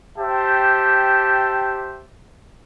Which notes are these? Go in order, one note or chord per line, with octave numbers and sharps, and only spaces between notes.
G4 C5 E5 G5 A5